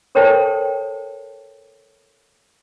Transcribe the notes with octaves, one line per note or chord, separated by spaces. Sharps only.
A4 A#4 C5 C#5 G5 A5